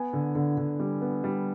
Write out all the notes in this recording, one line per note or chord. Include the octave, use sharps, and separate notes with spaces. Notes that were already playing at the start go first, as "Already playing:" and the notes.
Already playing: B3 G#5
D3
D3
D3
G3
B3
G3